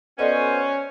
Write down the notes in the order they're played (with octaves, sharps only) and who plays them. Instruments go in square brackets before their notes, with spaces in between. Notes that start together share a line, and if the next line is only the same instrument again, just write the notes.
[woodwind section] B3 F#4 C5 [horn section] C#4 [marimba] A4 D5 D#5